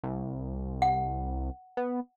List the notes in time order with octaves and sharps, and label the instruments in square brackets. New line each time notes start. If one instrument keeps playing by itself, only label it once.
[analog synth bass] C2
[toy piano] F#5
[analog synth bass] B3